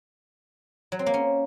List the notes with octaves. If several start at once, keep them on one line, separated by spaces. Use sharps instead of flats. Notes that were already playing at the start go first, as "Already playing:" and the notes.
F#3
C4
A#3
C#4